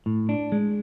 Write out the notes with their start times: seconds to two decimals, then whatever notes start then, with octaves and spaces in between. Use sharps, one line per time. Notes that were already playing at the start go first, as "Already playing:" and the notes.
0.06 A2
0.29 D4
0.52 G#3